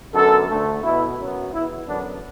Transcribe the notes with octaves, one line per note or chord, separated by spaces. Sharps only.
F#2 D3 B3 A4
D2 D3 A3
B2 B3 E4
F#2 F#3 B3
E2 B2 B3 E4
F#2 D3 F#3 B3 D4